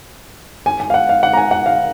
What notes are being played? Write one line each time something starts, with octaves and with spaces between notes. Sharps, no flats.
G#5
G#5
F5
F#5
F5
F#5
A#5
G#5
F#5
F5